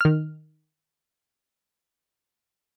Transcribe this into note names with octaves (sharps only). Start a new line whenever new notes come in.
D#3 F6